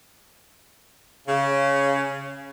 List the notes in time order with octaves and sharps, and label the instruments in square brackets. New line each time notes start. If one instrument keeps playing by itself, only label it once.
[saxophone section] C#3